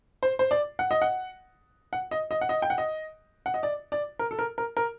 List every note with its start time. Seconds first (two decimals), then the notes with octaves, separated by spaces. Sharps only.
0.23 C5
0.39 C5
0.51 D5
0.79 F#5
0.91 D#5
1.02 F#5
1.93 F#5
2.11 D#5
2.31 D#5
2.41 F#5
2.49 D#5
2.62 G5
2.70 F#5
2.78 D#5
3.46 F#5
3.54 D#5
3.63 D5
3.92 D5
4.19 A#4
4.31 A4
4.39 A#4
4.58 A#4
4.77 A#4